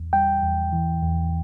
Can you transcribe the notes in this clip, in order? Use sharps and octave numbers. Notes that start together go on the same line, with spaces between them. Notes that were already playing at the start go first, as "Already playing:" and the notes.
Already playing: E2
G3 G5
E2
E3
E2